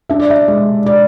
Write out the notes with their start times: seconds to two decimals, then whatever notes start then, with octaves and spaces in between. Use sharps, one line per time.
0.09 D4 E5
0.20 D5
0.30 E5
0.48 G#3
0.86 D5